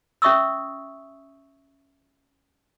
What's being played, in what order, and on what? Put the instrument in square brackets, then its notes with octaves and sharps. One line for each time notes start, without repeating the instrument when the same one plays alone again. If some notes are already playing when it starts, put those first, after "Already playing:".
[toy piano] C#4 E5 C#6 D#6 E6